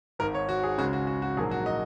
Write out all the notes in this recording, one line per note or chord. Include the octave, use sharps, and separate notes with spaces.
G#1 G#2 D#3 A#4
C#5
F#4
G#4
C#2 C#3 G#3 F#4
F#4
F#4
F#4
A#1 G#2 F#3 A#3 G#4
F#4
D#5